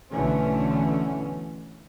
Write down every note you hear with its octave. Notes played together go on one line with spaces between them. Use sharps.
B1 B2 D3 E3 A3 C#4